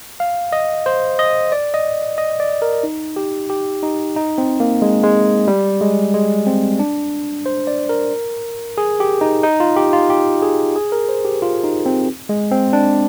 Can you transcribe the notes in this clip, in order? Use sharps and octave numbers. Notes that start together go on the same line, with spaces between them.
F5
D#5
C5
D#5
D5
D#5
D#5
D5
A#4
D#4
G4
G4
D#4
D#4
C4
A#3
G#3
G#3
G3
G#3
G#3
C4
D4
C5
D5
A#4
G#4
G4
D#4
D#4
F4
G4
F4
G4
G#4
G#4
A#4
C5
G4
F4
D#4
C4
G#3
C4
D4